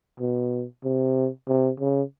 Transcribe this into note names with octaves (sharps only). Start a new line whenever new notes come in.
B2
C3
C3
C#3